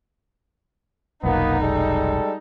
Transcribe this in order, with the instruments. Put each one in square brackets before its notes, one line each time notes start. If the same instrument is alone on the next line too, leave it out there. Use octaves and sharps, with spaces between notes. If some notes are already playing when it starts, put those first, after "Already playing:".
[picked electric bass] F1 B1 [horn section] A#3 B3 [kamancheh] D#4
[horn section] G3 G#3 A4